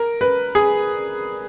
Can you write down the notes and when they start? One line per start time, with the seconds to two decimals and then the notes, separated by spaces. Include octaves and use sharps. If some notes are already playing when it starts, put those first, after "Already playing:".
Already playing: A#4
0.21 B4
0.55 G#4